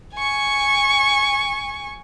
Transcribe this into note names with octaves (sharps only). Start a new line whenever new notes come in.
G#5 C#6